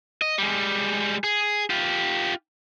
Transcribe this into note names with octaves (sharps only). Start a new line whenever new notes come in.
D#5
G3 G#3
G#4
F4 G4